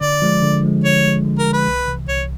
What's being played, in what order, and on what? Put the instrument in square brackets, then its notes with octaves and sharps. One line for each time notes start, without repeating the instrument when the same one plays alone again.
[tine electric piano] D3 [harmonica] D5
[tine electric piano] F3 G#3
D3
F3 G#3
[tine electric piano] D3 [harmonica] C#5
[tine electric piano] F3 G#3
D3
[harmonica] A#4
[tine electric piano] F3 G#3
[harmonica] B4
[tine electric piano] C2
C3 E3
[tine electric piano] C2 [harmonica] C#5